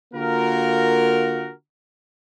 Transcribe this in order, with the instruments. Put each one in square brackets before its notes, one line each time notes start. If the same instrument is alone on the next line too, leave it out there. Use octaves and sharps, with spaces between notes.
[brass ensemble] D3 A#3 F4 F#4 A#4